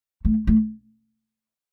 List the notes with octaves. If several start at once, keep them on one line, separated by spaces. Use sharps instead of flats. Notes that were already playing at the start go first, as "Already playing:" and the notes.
A3
A3